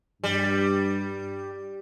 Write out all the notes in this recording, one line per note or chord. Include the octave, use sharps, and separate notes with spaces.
G2 G3